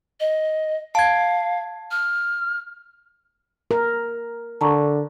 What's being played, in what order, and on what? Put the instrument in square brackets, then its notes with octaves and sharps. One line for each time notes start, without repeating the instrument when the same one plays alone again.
[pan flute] D#5
[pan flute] F5 [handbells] A5 G#6
[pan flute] F6
[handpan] A#4
[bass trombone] D3 [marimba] A5 A#5 C#6